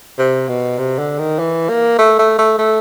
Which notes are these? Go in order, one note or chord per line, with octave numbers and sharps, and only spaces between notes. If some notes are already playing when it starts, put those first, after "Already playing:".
C3
B2
C3
D3
D#3
E3
A#3
A3
A3
A3
A3